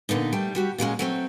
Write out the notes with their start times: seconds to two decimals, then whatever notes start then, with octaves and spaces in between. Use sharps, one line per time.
0.09 A#2 D3 B3 D#4
0.33 G3 A3 G5
0.55 G3 F#4 G4
0.78 A#2 F#3 G#3 C#4
0.99 F#3 A3 C4